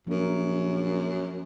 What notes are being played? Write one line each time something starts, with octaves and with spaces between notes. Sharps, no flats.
A#1 F#2 F3 A#4